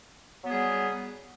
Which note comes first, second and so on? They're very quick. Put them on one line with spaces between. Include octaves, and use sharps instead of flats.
F#3 B3 G#4 G3